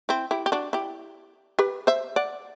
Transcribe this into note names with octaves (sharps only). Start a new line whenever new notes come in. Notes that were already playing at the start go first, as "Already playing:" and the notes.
C4 E4
E4 G4
G4
D4 F#4
E4 G4
G4 B4
C5 E5
D5 F#5